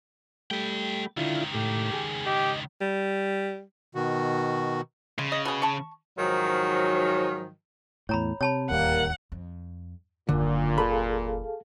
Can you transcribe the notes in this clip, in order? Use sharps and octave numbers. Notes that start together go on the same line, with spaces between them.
G3 A3 B4 G5
C#2 D3 D#3 E4 F4
A2 G4
G#4
G4 D#5
G3
B2 D#3 F#4
C#3 G#3
D#5
B2 G#4
A5 C#6
G#2 D#3 F3 F#3
E2 A2 C#5 A#5 B5
C3 C#5 A5 B5
D1 D#2 D#3 G3 A#3 F#5
F2
F#1 D#2 A#2 D3
G#4 A4 F5 B5